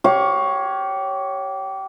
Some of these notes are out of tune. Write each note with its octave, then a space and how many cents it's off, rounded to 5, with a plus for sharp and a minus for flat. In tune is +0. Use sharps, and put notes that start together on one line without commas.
G4 -25 C#5 +0 F5 +25